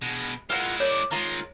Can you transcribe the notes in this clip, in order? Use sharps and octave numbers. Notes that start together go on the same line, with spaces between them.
B2 G#3
G#3 E4 F4 A#4 B4 F#5
A#4 C#5 D5
D#3 G#3 F4 A#5